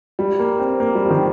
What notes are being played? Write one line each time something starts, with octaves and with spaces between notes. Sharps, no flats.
G3
A#3
C4
A#3
G3
F3
D#3